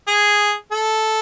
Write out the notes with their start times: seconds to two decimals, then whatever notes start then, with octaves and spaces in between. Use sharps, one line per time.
0.07 G#4
0.72 A4